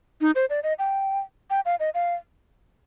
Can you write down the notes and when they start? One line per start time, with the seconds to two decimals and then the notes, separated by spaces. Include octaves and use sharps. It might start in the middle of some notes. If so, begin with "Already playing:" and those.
0.21 D#4
0.35 C5
0.50 D5
0.63 D#5
0.79 G5
1.50 G5
1.65 F5
1.80 D#5
1.94 F5